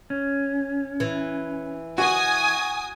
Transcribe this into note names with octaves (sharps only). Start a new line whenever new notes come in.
C#4
E3
F#4 F#5 G#5 D#6